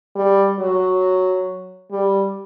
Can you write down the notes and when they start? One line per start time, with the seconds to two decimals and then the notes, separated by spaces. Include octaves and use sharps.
0.16 G3
0.59 F#3
1.92 G3